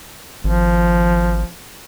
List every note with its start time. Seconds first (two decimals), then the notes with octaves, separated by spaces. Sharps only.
0.44 G#1 F3